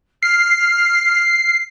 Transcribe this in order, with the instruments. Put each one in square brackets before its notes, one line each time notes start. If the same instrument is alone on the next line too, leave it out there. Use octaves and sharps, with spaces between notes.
[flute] F6 [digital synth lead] C7